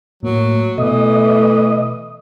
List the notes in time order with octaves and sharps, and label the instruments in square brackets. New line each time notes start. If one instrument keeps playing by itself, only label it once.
[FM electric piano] A2 A#3 [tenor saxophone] F#3
[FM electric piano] B2 [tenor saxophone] E3 [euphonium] A3 [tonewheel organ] D#5